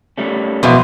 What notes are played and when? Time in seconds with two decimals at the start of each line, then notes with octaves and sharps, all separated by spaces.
0.18 G3 A3 C#4
0.63 E2 B2 F3 G#3 F4